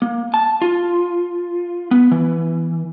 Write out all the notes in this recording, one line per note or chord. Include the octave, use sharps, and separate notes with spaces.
A#3
A5
F4
B3
E3